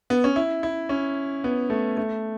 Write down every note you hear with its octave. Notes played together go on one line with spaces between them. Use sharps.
B3
C#4
E4
E4
C#4
B3
A3
A3